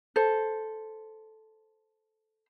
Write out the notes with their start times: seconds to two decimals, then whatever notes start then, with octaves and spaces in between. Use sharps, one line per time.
0.16 A4 C5